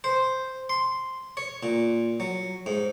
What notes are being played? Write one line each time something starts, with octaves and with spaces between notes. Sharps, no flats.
C5
C6
C#5
A#2
F#3
G#2